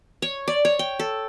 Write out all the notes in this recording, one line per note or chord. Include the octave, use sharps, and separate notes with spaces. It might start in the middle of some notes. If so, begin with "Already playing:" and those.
C#5
D5
C#5
G5
A4